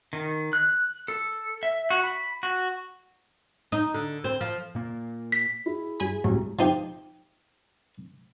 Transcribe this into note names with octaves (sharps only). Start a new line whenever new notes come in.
D#3
F#6
A4
E5
F#4
B5
F#4
D#4
D3
C4
F3
A#2 A#3
B6
E4 G#4
G2 G#5 B5
C2 A2 F#3
F3 D#4 G4